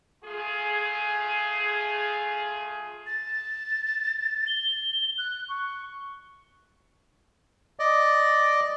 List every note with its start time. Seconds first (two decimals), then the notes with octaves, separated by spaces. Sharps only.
0.24 A3 F4 G#4
3.06 A6
4.47 G7
5.18 F#6
5.49 C#6
7.79 D5 D#5